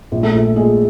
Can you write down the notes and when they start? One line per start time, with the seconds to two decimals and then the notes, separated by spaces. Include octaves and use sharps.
0.12 A#1
0.23 A3 A4
0.34 A#1
0.56 A#2 G#3 G#4